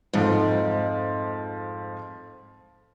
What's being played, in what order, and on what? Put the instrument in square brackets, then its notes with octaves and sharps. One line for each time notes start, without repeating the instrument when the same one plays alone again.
[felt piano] F2 F3 A3 [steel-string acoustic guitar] G#2